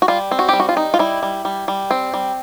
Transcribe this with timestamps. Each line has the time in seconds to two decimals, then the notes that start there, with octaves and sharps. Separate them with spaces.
0.02 F#4
0.08 G3 F4
0.31 C4
0.39 F#4
0.49 G3 G4
0.60 F#4
0.69 F4
0.77 D#4
0.94 F4
0.99 G3 E4
1.23 G3
1.45 G3
1.68 G3
1.91 C4
2.14 G3